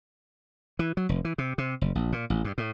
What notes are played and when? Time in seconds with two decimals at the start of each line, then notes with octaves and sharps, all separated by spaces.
0.79 E3
0.97 F#3
1.09 F1
1.25 E3
1.38 C3
1.58 C3
1.81 F#1
1.95 A#1
2.12 A#2
2.30 A1
2.44 G2
2.58 A2